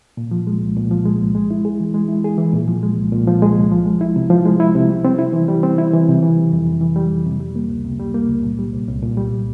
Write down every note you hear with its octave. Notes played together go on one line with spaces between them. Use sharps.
A#2
F3
G#3
C2
A#2
F3
G#3
C2
G#3
E4
G#4
E3
G#3
E4
G#4
E3
A#2
F3
G#3
C2
A#2
F3
G#3
C2
F3
G#3
E4
C3
F3
G#3
E4
C3
G3
C4
E4
E3
G3
C4
E4
E3
C3
E3
G3
F2
C3
E3
G3
F2
C3
G3
A#3
C#2
C3
G3
A#3
C#2
A#2
G3
C2
C2
A#2
G3